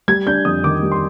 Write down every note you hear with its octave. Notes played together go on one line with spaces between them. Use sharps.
G3 G#6
D4 G6
F2 D#6
D#3 D6
G3
C6